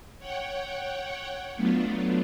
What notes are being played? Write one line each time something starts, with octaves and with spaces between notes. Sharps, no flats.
C#5 F#5 G5
F#3 A3 B3 D4 F4